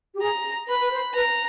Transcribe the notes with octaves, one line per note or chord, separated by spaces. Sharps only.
G4
G#4 A#5
B4 B5
B4
C5
B4 A#5